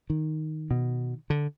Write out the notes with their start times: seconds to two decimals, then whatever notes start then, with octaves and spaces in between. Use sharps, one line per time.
0.10 D#3
0.71 B2
1.30 D3